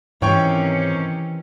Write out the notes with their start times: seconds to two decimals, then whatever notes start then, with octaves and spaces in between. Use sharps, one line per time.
0.22 G#2 C3 D#3 E3 C#4 C#5 G5 C#6